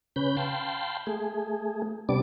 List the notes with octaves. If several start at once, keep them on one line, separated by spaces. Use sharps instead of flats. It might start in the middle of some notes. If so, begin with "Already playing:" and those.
C#3 C#4 B4 B5 G6
F5 G5 A5 B5 C6
A3 G#4
C3 G3 B3 D4 D5 D6